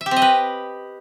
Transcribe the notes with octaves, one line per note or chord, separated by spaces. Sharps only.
E5
G4
C4
D#5
B4